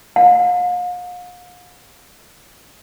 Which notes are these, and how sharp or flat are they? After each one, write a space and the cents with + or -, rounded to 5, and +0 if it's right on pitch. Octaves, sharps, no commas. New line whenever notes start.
F5 +40